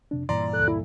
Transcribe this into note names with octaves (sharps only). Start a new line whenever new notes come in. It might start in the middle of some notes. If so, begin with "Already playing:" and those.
F2 C3 D4
G2 A#2 E3 D5 A#5 C6
D2 A4 F#6
E4